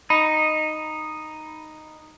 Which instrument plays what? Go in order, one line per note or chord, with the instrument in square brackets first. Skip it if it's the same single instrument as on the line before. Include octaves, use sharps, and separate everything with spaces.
[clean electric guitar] D#4 [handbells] B5 C#7